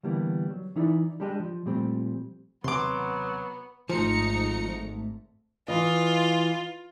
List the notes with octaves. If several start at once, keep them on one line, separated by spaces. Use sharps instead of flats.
D3 E3 G3 A#3 B3
F#3
E3 D#4 E4 A4 B4 D5
G3 G#3 D4 G4 G#4 D#5
F3
A#2 F3 G3 A3 C4
D#2 C3 F#3 B3 C6 D6
G#1 G#2 F3 A3 D#4 A#5 C#7
E3 F4 D#5